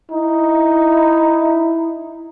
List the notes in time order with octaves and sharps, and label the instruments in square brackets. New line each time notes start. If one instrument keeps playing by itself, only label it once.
[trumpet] D#4 [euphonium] E4